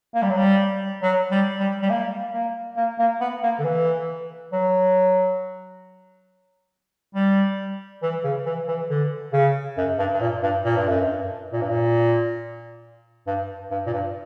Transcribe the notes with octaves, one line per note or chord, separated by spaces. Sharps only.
A#3
G3
F#3
G3
F#3
G3
G3
G3
A#3
A#3
A#3
A#3
B3
A#3
D3
E3
F#3
G3
E3
C#3
E3
E3
D3
C#3
F#2
G2
G2
A#2
G2
A#2
G2
F#2
G2
A#2
G2
A#2
G2
G2
A#2
G2